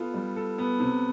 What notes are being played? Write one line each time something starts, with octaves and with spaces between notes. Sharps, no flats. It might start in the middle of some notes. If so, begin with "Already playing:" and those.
Already playing: B3 F4 A4
G3
A4
B3
C3